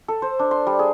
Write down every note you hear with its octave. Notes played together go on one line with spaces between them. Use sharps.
A4
C5
D4
C6
G3
G#4